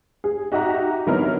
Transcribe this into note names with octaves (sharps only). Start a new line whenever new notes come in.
G#4
D#4 F#4 G4 D#5 E5 A#5
D3 F#3 B3 D#4 E4 A#4